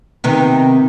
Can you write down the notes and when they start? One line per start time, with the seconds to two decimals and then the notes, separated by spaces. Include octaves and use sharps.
0.24 C3 D#3 B3